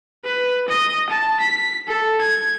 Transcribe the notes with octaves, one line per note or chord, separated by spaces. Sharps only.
B4
D#5
A5
B6
A4
G#6